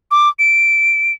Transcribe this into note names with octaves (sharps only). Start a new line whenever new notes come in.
D6
D7